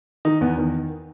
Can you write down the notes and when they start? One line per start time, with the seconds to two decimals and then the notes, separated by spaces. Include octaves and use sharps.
0.25 D#3 D#4
0.41 E2 B3
0.58 D#3